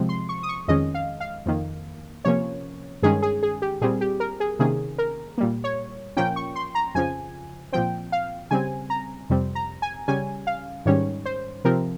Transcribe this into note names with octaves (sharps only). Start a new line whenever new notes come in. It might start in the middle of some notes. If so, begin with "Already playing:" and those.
Already playing: C3 F3 G#3 C4
C6
C#6
D#6
C#6
F2 D#3 G#3 C#4 D#5
F5
F5
F2 D#3 A#3
C3 F3 A#3 C#4 C#5
G2 D#3 G#3 C#4 G#4
G#4
G#4
G4
A#2 G3 C4 G#4
G4
A#4
G#4
C3 D#3 A#3 C#4 G#4
A#4
A#2 G3 A#3
C#5
A#2 F3 A#3 C#4 G5
C#6
C6
A#5
F2 C#3 F3 G#5
A#2 F3 C4 G5
F5
C#3 G3 C4 G#5
A#5
F2 C3 G3 C4
A#5
G#5
C#3 G3 C#4 G#5
F5
G#2 D#3 G3 C#4 C#5
C5
C3 F3 C4 A#4